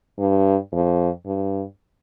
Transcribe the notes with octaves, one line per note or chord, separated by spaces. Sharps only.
G2
F2
G2